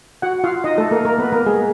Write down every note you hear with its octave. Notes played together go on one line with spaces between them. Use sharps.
F#4 F#5
F4 F5
D#4 D#5
A3 A4
A#3 A#4
A#3 A#4
B3 B4
A#3 A#4
G#3 G#4